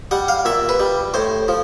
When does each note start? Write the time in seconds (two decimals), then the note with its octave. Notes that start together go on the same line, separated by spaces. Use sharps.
0.11 G3 F#5
0.28 F5
0.45 A#2 E5
0.69 B4
0.80 G3
1.14 A2 C5
1.48 F3